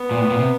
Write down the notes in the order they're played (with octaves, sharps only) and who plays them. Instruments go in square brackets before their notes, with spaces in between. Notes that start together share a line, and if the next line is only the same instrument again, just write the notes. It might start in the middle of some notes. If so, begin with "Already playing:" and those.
Already playing: [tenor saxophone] B3
[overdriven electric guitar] A#2
A2
A#2
C3